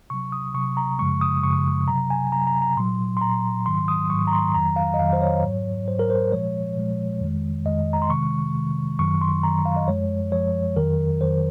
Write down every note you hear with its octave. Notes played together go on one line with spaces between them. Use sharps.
C3 F#3 C#6
D#6
C3 F#3 C#6
A#5
F#2 C#3 F3 G#3 C#6
D#6
F#2 C#3 F3 G#3 C#6
C3 F#3 A#5
G#5
C3 F#3 A#5
A#5
A#5
A#2 F#3 C6
C6
A#2 F#3 A#5
G#2 D#3 F#3 C6
D#6
G#2 D#3 F#3 C#6
A#5
C6
F2 D#3 F#3 A#5
F5
D#5
F2 D#3 F#3 F5
C5
C#5
G#2 F#3
G#2 F#3 C5
A#4
C5
A#2 F3 G#3 C#5
A#2 F3 G#3
F2 D#3 G#3
F2 D#3 G#3 D#5
A#5
C6
C3 D#3 G#3 C#6
C3 D#3 G#3
F#2 D#3 F#3 C#6
C6
F#2 D#3 F#3 A#5
F5
D#5
F#2 F3 G#3 C#5
F#2 F3 G#3 C#5
F2 D#3 F#3 A#4
F2 D#3 F#3 C5